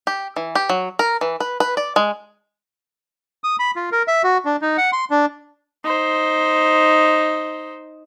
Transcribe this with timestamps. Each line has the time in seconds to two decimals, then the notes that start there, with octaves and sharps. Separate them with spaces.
0.07 G4
0.36 E3
0.55 G4
0.69 F#3
0.99 A#4
1.21 E3
1.40 B4
1.60 B4
1.77 D5
1.96 G#3
3.44 D#6
3.59 B5
3.76 F4
3.92 A#4
4.08 E5
4.24 F#4
4.45 D4
4.62 D#4
4.78 F#5
4.93 C6
5.10 D4
5.84 D#4 C5